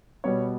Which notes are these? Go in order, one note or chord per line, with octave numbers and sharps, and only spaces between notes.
B2 G3 B3 C#5